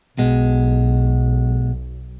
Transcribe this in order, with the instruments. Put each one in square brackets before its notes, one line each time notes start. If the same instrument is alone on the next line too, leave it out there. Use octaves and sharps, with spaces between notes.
[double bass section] B1 [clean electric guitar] B2 G#3